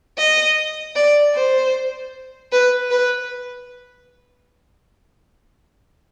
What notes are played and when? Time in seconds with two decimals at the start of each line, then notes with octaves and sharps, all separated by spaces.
0.18 D#5
0.96 D5
1.35 C5
2.52 B4
2.91 B4